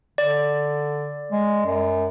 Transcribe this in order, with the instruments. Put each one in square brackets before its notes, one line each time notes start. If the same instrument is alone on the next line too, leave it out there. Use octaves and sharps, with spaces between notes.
[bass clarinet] D3 [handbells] D5
[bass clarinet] G#3
F#2